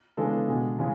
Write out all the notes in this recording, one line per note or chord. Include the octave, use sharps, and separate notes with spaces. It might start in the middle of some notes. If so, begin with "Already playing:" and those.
C#3 E3 G#3 B3 D4 A4
B2 G#3 D4
C#3 E3 G#3